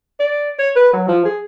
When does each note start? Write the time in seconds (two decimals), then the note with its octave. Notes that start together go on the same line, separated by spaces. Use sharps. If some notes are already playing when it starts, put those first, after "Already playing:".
0.20 D5
0.59 C#5
0.76 B4
0.93 F#3
1.08 F3
1.25 G#4